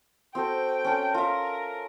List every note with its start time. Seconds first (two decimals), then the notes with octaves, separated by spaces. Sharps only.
0.35 C4 F#4 A4 G5
0.84 C#4 A4
1.14 F4 A#4 E5